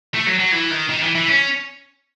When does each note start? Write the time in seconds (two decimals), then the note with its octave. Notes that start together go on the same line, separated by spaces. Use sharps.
0.14 A3
0.27 F#3
0.40 F#3
0.52 E3
0.71 D#3
0.90 D#3
1.03 E3
1.15 E3
1.29 C#4